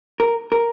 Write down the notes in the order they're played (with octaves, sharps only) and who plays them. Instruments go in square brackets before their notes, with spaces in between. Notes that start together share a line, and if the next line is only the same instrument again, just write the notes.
[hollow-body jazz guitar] A#4
A#4